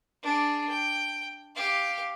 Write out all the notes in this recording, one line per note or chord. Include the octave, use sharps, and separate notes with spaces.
D4 G#4
G5
G4 F5